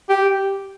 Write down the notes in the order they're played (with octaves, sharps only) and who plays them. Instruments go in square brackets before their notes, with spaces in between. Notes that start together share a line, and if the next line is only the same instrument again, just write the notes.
[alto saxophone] G4